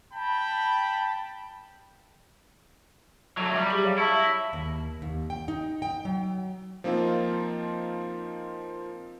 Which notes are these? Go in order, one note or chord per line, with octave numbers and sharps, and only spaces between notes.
G5 A5 B5
F#3 A3 F7
G3
G4 G#4 F#7
C#5 F5
E4 E5 A5 C#6
A#6 B6
D#2
D#2
G5
D#4
G5
F#3
F3 A#3 C4 D#4 F4